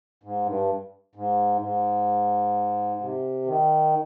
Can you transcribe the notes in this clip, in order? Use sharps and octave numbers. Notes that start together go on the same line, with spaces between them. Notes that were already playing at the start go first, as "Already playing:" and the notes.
G#2
G2
G#2
G#2
C3
D#3